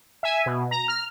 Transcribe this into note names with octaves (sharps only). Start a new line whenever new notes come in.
E5 G#5
B2
A#5
F6